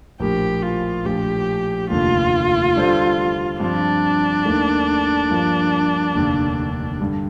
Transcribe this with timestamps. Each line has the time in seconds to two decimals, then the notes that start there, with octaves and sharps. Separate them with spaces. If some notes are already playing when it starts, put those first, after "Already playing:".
0.20 A#1 A2 F3 A#3 G4
0.62 F4
1.05 A#1 A2 F3 G4
1.90 F1 D#2 D3 A3 F4
2.76 D3 G3 D4 A4 C5
3.60 G2 F3 C4 D4
4.45 D#2 D#3 A3
5.31 G2 F3 A#3 F4
6.15 F1 D#2 D3
7.00 G2 D3 G3